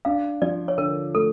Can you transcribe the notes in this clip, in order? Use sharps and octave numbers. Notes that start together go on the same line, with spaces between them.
D4 F5
F3 D5
C#5
D3 A#4
A3 A4